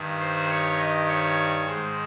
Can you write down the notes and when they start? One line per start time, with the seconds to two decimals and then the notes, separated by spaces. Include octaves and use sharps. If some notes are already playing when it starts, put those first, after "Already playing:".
Already playing: G2 D#3 G3
0.19 C5
0.50 C#5
0.79 D#5
1.08 C#5
1.66 G#2 D#3 G#3 C5